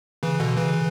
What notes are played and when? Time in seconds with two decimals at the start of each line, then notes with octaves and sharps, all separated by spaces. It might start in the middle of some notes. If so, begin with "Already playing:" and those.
0.23 C#3 E3
0.40 B2 D3
0.57 C#3 E3